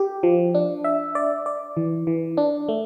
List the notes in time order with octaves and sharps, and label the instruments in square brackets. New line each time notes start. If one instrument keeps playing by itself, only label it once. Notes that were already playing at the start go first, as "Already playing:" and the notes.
Already playing: [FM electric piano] G4
F3
D4
E5
D5
D5
E3
E3
D4
A3